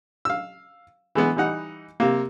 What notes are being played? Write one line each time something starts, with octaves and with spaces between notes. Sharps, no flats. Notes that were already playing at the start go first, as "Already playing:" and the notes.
F5 E6
E3 G#3 B3
E3 G3 D#4 F#5
C3 A#3